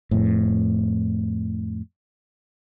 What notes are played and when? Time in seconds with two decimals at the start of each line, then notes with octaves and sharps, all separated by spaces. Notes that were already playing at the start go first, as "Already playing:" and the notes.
0.11 F2 A2